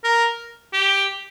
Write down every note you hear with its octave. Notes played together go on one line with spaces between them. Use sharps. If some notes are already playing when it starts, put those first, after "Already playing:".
A#4
G4